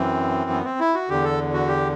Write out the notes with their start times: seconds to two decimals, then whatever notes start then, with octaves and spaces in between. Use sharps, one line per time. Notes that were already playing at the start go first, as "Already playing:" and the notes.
Already playing: F#2 E3 C4
0.50 B3
0.64 C4
0.80 E4
0.94 F#4
1.09 E2 D3 G4
1.24 A4
1.54 F#4
1.68 G4